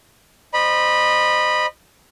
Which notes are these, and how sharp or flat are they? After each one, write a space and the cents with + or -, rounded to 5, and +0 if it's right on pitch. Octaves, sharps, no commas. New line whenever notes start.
C5 -10 D#5 -30 B5 -15